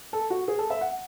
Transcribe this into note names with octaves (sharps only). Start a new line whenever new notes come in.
A4
F#4
G#4
A4
E5
F#5